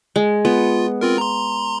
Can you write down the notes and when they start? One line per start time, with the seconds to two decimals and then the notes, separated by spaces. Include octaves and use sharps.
0.16 G#3
0.45 B3 F4
1.01 C4 F4 A#4
1.18 A#5 C6